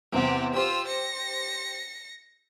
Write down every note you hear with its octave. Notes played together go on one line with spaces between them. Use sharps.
E2 C3 C4 G4 F#5
F4 G4 C5 E6
A#6 C#7